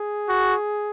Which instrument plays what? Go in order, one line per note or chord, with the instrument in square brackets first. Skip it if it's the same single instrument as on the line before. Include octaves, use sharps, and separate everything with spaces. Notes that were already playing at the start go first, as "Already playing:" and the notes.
Already playing: [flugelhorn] G#4
[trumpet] F#4